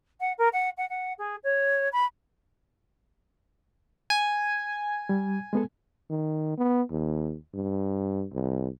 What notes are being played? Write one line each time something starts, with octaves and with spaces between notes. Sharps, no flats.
F#5
A#4
F#5
F#5
F#5
G#4
C#5
B5
G#5
G3
G#3 B3 A4
D#3
B3
D#2
G2
C2